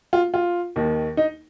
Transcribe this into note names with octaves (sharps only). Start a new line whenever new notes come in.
F4
F4
D#2 D#3
D#4